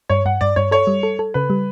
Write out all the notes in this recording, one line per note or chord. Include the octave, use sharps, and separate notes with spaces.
G2 C#5
G2 F#5
G2 D5
G2 C#5
A4 C#5
G3
A4
A4
C#3 B4
G3